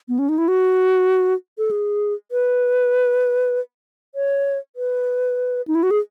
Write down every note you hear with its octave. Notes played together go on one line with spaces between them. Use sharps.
B3
C#4
D#4
E4
F#4
A4
G#4
B4
C#5
B4
D#4
E4
F#4
G#4